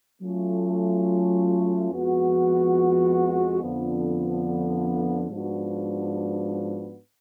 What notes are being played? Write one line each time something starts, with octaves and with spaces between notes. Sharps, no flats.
F#3 A3 C#4 F4
F2 F3 G#3 B3 F#4
F2 D3 F3 B3
G#2 F3 B3 D4 F#4